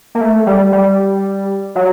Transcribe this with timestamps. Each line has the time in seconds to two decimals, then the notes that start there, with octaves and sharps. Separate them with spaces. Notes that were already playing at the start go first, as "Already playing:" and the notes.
0.15 A#3
0.21 A3
0.46 G3
0.72 G3
1.75 F#3